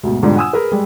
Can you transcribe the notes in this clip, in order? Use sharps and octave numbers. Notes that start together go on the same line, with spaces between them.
D2 G#2 B2
F2 G#2 B2 D3 G3 D4
F#5 G#5 D#6 E6
G#4 A#4 B4
G3 G#3